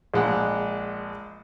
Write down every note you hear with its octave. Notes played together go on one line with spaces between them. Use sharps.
A#1 G#3 F#5